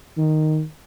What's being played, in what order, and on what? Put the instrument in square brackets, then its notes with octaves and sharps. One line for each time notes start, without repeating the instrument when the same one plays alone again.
[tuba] D#3